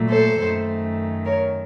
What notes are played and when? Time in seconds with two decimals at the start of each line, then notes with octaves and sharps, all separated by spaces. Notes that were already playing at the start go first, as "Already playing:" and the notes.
Already playing: A#2 F#3 A3
0.09 A4 C5
0.38 F#2 D#3 A3
1.25 A#4 C#5